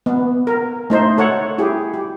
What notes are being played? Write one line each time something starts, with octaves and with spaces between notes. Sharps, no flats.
B3
A#4
A3 D#4 C5
A4 C#5 F#5
E4 G4 G#4
G4